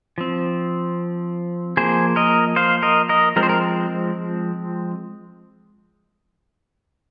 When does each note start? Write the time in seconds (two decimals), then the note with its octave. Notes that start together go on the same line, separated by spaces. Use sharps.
0.18 F3 C4
1.77 F3 A#3 G#4 C5
2.16 A#4 D#5
2.56 C5 F5
2.83 A#4 D#5
3.09 A#4 D#5
3.36 F3 G#3 C4 A#4
3.43 C5
3.49 A#4